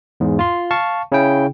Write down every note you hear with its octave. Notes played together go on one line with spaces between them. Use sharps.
E2 G#2
F4 C6
F5 A5 C#6
C#3 C#4 E4 G5